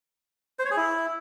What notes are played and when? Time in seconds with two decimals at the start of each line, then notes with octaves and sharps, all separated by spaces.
0.59 C5
0.65 C#5
0.71 G#4
0.77 E4